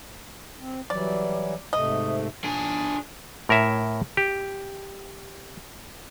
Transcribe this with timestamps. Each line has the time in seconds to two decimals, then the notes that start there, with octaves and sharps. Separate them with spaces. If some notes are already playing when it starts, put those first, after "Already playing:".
0.60 C4
0.90 E3 F#3 G3 D5
1.73 G#2 C3 A3 D#5
2.44 D4 G#4
3.49 A2 A#4 C#5 E5
4.17 G4